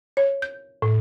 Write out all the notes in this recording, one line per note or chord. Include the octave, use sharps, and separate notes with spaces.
C#5
G6
A2